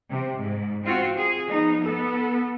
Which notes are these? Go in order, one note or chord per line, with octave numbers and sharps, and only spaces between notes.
C3
G#2
C4 F4 F#4
G#4
F3 B3 D#4
B3 A4